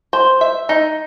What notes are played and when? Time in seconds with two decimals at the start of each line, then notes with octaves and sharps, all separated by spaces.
0.13 C5
0.41 E5
0.69 D#4